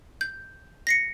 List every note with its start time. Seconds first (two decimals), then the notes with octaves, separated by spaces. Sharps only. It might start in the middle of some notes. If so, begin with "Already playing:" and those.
0.21 G6
0.87 A#6 C7 C#7